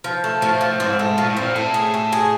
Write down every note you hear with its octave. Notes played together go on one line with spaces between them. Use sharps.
F3
A3
A2 F3
F3
G#2 C4
A3
A#2 F3
A2
A#2 C4
A2 A3
G#4
A3
G#4